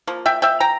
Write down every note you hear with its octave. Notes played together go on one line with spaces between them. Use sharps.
F3 A#3
E5 G5
E5 G5
G5 A#5